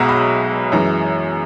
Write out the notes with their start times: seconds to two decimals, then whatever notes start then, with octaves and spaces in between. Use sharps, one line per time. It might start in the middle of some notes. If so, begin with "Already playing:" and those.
Already playing: B1 B2 G#3 E5 F#5 A#5
0.09 B5
0.72 F#2 E3 G#3 A#5